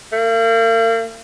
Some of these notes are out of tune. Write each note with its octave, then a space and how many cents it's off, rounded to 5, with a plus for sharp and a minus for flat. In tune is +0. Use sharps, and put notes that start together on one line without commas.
A#3 -45